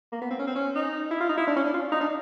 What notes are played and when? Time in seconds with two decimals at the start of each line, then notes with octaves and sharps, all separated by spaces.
0.12 A#3
0.22 B3
0.31 C4
0.39 C#4
0.47 C4
0.56 C#4
0.76 D#4
1.11 E4
1.21 F4
1.29 D#4
1.38 E4
1.48 D4
1.56 C#4
1.65 D4
1.74 F4
1.92 D#4
2.01 D4